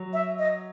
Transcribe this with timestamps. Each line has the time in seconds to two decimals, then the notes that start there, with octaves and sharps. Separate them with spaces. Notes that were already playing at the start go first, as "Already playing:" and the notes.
Already playing: F#3
0.13 E5
0.39 D#5